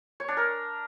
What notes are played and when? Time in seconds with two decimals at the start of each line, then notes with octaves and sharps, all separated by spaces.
0.20 C#5
0.28 D4
0.37 A#4